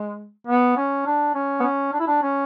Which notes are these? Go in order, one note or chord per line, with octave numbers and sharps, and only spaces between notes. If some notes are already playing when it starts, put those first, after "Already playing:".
Already playing: G#3
B3
C#4
D4
C#4
B3
C#4
D4
E4
D4
C#4